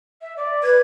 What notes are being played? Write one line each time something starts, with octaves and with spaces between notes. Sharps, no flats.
E5
D5
B4 G#6